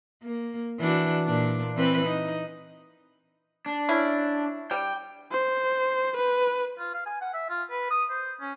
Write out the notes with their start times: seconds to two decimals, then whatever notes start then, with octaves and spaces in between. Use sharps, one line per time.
0.23 A#3
0.80 E3 D4 F#4
1.25 A#2 D4
1.75 E3 C4 B4
2.06 D#4
3.66 D4
3.89 C#4 E4
4.71 G3 G5
5.32 C5
6.16 B4
6.79 F4
6.93 F5
7.06 G#5
7.21 F#5
7.34 E5
7.49 F4
7.71 B4
7.90 D#6
8.10 C5
8.40 C#4